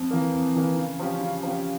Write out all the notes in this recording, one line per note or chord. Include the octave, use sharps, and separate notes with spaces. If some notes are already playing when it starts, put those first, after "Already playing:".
Already playing: F2
E3 A#3
F2
E3 A#3
C#3
F3 C#4 G4
C#3
F3 C#4 G4